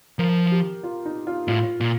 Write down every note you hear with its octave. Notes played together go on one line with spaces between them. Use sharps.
F3 A#4
G4
F4
D#4
F4
A2 F4
A#2